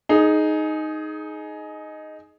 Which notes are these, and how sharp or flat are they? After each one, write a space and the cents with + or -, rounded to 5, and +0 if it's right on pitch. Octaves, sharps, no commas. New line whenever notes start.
D#4 +0 G#4 +20